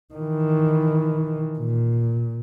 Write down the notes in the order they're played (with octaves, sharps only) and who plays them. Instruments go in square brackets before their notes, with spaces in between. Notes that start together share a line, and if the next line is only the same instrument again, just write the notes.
[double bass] D#3 E3
A#2